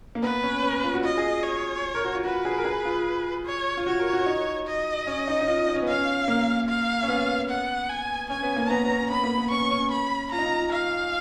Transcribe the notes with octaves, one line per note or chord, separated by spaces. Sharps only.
A#3
B3 B4
C#4
C#4
F4
F#4
F4 D#5
G#4
C#5
A#4
F#4
F4
F#4 B4
G#4
A#4
G#4
F4
C#5
F4
F#4 C#5
A#4
F#4
D#4
D#5
C#4
D#4
D#4
F4
D#4
C#4
B3
C#4 F5
A#3
F5
C#4
B3
F#5
G#5
C#4 G#5
B3
A#3
C#4
B3 A#5
B3
C#4
B3 B5
A#3
B3
C#4 C#6
C#4
B5
F4 A#5
D#4
F4
F5